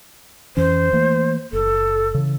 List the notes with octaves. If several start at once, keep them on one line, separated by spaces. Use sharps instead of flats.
F2 E3 C#4 C5
E3 A3 A#3
F#1 A4
C#3 E3